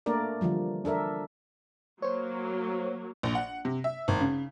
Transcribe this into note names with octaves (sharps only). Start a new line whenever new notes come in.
A3 A#3 D4 A#4 D5
D3 E3 F3 G3
D4 A4 A#4 E5
F#3 A#3 C5 C#5
A#1
F#5
C3
E5
G#1
C#3